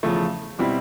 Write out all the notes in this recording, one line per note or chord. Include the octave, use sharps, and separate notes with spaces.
E2 C#3 F3 A3
B2 G3 C4 E4